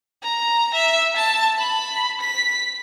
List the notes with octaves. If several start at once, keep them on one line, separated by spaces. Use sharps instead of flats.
A#5
E5
A5
B5
B6